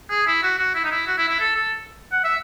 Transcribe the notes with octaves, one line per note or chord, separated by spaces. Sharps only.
G#4
E4
F#4
F#4
E4
D#4
E4
F#4
E4
E4
A4
A4
F#5
E5